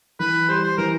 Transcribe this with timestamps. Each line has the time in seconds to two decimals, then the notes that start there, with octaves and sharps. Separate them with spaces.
0.20 E3 B4
0.49 G3 C5
0.64 C5
0.77 E3 A#4